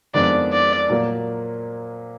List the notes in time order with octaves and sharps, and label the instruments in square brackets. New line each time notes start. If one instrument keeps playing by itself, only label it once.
[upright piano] F2 D#3 G#3 B3 D4 [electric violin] D5
[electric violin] D5
[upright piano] A#2 F#3 A#3